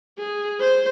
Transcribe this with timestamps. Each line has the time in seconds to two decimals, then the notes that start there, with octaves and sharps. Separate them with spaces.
0.18 G#4
0.60 C5